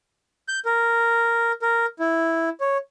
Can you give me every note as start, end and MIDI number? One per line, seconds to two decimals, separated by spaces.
0.48 0.59 91
0.65 1.52 70
1.62 1.86 70
1.99 2.49 64
2.60 2.78 73